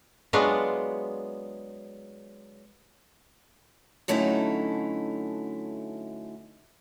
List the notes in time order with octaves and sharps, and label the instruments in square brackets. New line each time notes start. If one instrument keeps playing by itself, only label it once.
[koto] F#3 G#3 B3 D4 F4 F#5
[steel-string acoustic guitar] D3 F#3 A3 C#4 D#4 E4